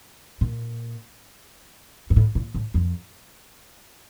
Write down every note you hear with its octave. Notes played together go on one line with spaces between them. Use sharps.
A#2
G2
A2
A#2
A2
F2